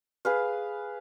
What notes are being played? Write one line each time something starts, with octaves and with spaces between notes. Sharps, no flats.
G#4 B4 F5